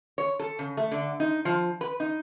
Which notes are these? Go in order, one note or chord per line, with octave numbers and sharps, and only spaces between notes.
C#5
A4
C#3
A3
D3
D#4
F3
B4
D#4